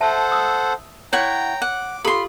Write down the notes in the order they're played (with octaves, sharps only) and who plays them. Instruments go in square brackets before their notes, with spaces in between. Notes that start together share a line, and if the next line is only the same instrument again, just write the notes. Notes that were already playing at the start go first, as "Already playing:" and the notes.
[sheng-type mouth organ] A4 C5 F#5 [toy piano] E5 A5
[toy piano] D#6 E6
[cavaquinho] E4 F#5 C#6 [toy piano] C#5 [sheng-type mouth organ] G5 A#5
[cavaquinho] F#5 [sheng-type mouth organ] D6
[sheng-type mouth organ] F4 [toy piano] G4 A4 [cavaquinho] B5 C6